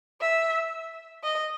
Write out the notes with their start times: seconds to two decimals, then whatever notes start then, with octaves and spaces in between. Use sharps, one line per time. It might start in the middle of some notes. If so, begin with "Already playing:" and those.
0.21 E5
1.23 D#5